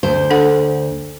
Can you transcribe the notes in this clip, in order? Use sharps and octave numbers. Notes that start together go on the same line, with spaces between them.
D2 C5
D4 A4 F#5